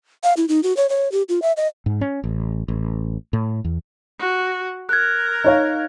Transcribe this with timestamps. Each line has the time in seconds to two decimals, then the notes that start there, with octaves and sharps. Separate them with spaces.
0.23 F5
0.37 E4
0.49 D#4
0.63 F#4
0.77 C#5
0.89 C#5
1.12 G4
1.29 F4
1.42 E5
1.57 D#5
1.86 G#2
2.01 C#4
2.24 A1
2.68 A1
3.33 A2
3.64 E2
4.19 F#4
4.89 A#4 F#6 G#6
5.44 D#4 C#5 F5